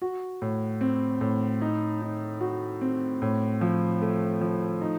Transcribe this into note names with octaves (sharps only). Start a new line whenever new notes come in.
F#4
A2
C4
A2
D#4
D#4
F#4
C4
A2
F3
A3
F3
D#4